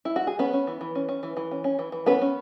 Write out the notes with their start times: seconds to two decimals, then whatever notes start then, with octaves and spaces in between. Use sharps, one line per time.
0.05 E4
0.16 F#4
0.27 G#4
0.39 B3 C#4 B4
0.53 C#4
0.67 E3
0.81 E3
0.95 C#4
1.09 C#4
1.23 E3
1.37 E3
1.51 C#4
1.64 C#4
1.79 E3
1.92 E3
2.06 B3 C#4 B4
2.22 C#4